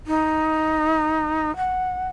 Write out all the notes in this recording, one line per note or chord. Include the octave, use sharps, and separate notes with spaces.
D#4
F#5